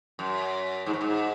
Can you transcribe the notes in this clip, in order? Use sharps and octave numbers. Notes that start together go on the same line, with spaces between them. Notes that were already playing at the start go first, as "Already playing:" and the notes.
F#2
G#2
G2
G#2